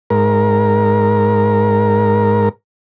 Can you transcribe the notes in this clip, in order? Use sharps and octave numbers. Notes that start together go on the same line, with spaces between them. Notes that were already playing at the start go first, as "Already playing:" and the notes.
G#2 A#4